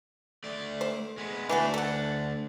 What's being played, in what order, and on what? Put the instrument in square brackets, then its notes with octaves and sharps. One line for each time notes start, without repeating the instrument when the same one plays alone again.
[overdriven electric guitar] A3 D5
[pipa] C5
[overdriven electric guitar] G#3 B3
[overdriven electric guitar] D2 D4 [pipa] E3 A3 F#4
[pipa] A4 F#5